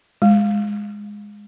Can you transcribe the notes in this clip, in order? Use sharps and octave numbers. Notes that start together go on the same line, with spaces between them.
G#3